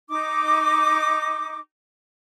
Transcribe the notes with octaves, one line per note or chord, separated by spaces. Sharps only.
D#4 D6